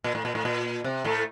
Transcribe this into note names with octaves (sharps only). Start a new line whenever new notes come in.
A#2
A2
A#2
A2
A#2
C3
A2 A3